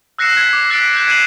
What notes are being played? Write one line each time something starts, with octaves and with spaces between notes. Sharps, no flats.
E6 F#6 A#6 C7 C#7 E7
G#6 B6
D6
E6 F#6 A6 B6 C#7 D7
F#6 G6 C#7 E7
G#6 C7 D#7 E7 F#7